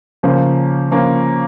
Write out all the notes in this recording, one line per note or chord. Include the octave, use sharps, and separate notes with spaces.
C#3 F3 A#3 C#4
F3 A#3 C#4